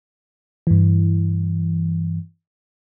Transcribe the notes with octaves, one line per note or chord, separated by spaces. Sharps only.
G2 E3